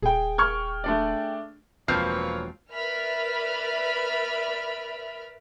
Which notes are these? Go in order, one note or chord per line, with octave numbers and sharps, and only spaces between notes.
D#1 G#4 G5
C#6 F6 G#6
A3 D4 D5
E1 F3 A#3 C4 B4 C#5 F6 C7
A#4 B4 D5 E5 B5 F6